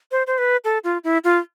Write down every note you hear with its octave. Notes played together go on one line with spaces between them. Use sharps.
C5
C5
B4
A4
F4
E4
F4